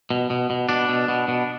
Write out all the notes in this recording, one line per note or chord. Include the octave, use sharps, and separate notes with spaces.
B2
B2
B2
B2 D4
B2
B2
B2